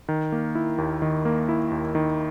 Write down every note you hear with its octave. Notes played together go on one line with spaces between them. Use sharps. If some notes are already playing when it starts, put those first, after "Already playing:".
D#3
A#3
E4
D#2
D#3
A#3
E4
D#2
D#3